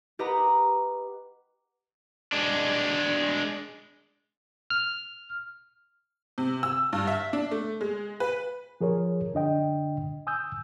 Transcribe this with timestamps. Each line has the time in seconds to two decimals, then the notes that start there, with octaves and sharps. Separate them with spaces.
0.19 G4 B4 D#5 F#5 A#5
2.32 G#3 D4
4.70 F6
6.38 C3
6.63 E6
6.93 G2
7.07 E5
7.33 D4
7.51 A3
7.81 G#3
8.20 B4
8.81 F3 G#4 A#4 C#5
9.33 F#2 D3 D4 D#5 G5
10.27 G#5 D#6 E6 G6